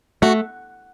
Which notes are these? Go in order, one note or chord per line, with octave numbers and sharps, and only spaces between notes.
A3 F#4